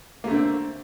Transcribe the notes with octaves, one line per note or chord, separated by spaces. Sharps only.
D3 A3 A#3 C4